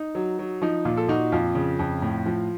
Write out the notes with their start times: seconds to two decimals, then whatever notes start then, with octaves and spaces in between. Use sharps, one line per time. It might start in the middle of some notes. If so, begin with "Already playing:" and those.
Already playing: D#4
0.15 F#3
0.39 F#3
0.62 F3 D#4
0.85 A#2 F4
0.97 A4
1.08 A#2 D#4 F#4
1.32 F2 F4
1.55 C#3
1.79 F2
2.02 A2
2.26 F3